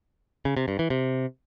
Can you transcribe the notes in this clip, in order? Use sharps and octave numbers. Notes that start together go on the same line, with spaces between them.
C#3
C3
G2
E3
C3